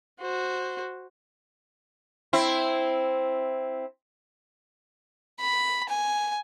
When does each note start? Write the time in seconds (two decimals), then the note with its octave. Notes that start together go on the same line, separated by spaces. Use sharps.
0.21 F#4 C5
2.33 C4 E4
5.40 B5
5.89 G#5